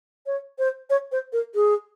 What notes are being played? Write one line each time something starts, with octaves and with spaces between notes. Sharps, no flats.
C#5
C5
C#5
C5
A#4
G#4